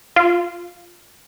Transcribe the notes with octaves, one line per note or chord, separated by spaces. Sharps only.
F4